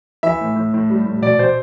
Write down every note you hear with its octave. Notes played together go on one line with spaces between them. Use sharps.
E3 E5
A2
A2
A2
G3
A2
B2 D5
B2 C5